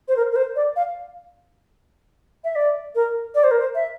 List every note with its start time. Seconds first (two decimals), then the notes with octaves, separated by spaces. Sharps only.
0.08 C5
0.17 A#4
0.32 A#4
0.36 C5
0.56 D5
0.76 F5
2.44 E5
2.56 D5
2.95 A#4
3.35 D5
3.44 C5
3.51 A#4
3.60 C5
3.75 E5